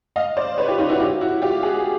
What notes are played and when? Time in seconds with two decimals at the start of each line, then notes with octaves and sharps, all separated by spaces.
0.16 D#5 F5
0.37 C5 D5
0.58 B4 C#5
0.68 F4 G4
0.79 D#4 F4
0.89 E4 F#4
1.00 F4 G4
1.21 E4 F#4
1.42 F4 G4
1.63 F#4 G#4